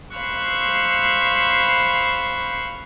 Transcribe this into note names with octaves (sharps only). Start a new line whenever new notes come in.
C5 F5 B5 C#6 E6 F#6